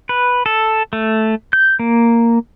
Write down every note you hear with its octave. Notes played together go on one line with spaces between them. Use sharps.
B4
A4
A3
G6
A#3